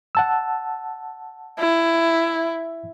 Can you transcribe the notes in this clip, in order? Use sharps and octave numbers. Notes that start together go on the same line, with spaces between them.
F#5 A5 E6
E4